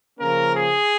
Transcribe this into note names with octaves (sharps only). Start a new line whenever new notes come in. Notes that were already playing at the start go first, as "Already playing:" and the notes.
C#3 F3 A#3 C#4 A#4
G#4